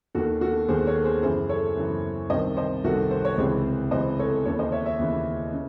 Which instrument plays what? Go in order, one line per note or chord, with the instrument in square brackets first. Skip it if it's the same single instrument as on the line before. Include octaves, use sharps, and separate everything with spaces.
[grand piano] D#2 D#3 F#4 A4
F#4 A4
D#2 D#3 G#4 C5
A4 C#5
G#4 C5
F#2 C#3 E3 G#4 C5
A4 C#5
F#2 C#3 E3
C2 C3 D#3 C5 D#5
C5 D#5
C2 C3 D#3 F#4 A4
C5
C#5
C#2 C3 E3 G#4 C5
C#2 C3 E3 C5 D#5
A4 C#5
D#2 C#3 E3 A4 C#5
C5 D#5
C#5 E5
C#5 E5
D#2 C#3 E3
C#3